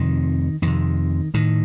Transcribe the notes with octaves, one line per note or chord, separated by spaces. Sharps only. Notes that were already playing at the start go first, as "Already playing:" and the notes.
Already playing: F2 C3 D#3
F2 C3 D#3
A2 D#3